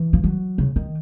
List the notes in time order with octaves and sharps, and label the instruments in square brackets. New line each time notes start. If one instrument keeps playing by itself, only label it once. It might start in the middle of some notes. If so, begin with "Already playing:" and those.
Already playing: [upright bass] E3
F3
F#3
C#3
D#3